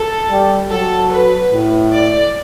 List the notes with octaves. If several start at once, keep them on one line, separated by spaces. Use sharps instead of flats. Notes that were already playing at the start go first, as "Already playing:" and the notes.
Already playing: A4
G3
F#3 A4
B4
A2
D5